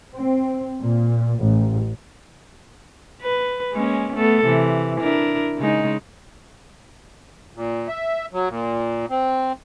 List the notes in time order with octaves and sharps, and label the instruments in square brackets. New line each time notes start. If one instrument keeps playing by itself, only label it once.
[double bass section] C4
A#2
A1
[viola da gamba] B4
G#3 A#3 C#4
A3 B3 A4
C3 E3
D4 E4 A#4
C#3 G#3 D#4
[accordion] A#2
E5
F#3
A#2
C4